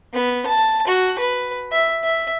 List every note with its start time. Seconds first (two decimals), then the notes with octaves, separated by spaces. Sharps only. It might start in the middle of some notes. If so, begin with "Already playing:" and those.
0.13 B3
0.46 A5
0.87 F#4
1.18 B4
1.72 E5
2.03 E5